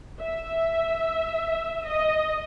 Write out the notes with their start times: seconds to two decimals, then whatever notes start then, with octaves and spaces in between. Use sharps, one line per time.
0.19 E5
1.86 D#5